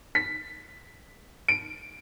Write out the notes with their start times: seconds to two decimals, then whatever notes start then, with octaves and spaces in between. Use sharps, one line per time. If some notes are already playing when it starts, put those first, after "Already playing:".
0.15 B6
1.48 D7